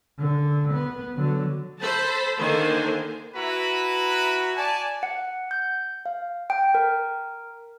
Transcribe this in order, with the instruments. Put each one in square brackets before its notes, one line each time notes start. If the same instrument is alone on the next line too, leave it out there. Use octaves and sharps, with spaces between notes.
[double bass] D3
B3
D3 F#3
[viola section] A4 C5 A5 B5
D3 D#3 A#3 C5 G#5
[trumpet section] E4 F#4 B4 A#5 B5
D5 G#5 A5
[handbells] F#5
G6
F5
G5
A#4